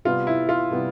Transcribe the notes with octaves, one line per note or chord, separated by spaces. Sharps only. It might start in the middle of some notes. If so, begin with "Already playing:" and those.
C3 G3 B3 F4
E4
F4
C3 G3 B3